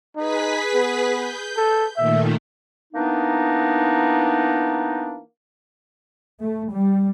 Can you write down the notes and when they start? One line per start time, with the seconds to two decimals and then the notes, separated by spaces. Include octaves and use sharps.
0.16 D#4 G#4 B4 B6
0.74 B3
1.13 G6
1.57 A4
1.97 A#2 D#3 A3 E5
2.94 E3 A#3 B3 D4 D#4
6.42 A3
6.72 G3